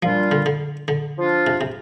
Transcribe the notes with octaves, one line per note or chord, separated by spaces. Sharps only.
A#2 F3 G3 D4 F4
D3
D3
D3
F3 D4 F4
C3
C3